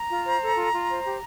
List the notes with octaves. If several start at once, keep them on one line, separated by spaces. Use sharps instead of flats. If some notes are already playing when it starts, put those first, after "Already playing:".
Already playing: A#5
F4
C5
A4
F4
F4
C5
G4